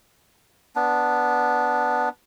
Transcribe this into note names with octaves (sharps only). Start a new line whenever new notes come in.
B3 D4